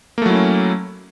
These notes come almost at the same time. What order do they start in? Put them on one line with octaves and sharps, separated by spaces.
A#3 A3 F#3 E4 C#4